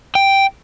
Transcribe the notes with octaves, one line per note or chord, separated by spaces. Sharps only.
G5